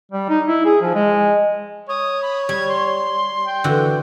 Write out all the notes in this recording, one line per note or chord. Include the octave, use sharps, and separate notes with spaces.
G3
D#4
E4
G#4
F3
G#3
C#5 D#6
B5
G3 G#6
C6
G5
D3 E3 F#4